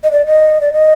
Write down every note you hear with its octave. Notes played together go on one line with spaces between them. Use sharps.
D#5
D5
D#5
D5
D#5